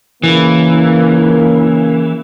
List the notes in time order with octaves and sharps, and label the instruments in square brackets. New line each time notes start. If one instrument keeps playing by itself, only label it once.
[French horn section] C#3 A#3 [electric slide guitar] E3